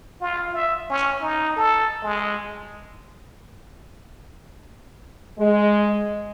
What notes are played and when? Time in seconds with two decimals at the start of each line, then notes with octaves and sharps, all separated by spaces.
0.21 F4
0.53 E5
0.90 C#4
1.22 D#4
1.57 A4
2.03 G#3
5.39 G#3